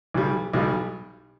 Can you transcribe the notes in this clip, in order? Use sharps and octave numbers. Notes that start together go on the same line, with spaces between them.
B1 B2 G3
B1 B2 G3